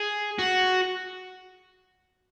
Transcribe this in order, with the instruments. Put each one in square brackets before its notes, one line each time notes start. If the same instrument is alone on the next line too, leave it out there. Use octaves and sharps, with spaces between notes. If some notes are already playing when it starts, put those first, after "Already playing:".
Already playing: [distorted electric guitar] G#4
F#4